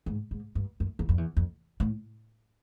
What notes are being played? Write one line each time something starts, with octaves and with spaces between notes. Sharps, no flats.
G#2
G#2
G2
F#2
E2
F2
E2
F2
A2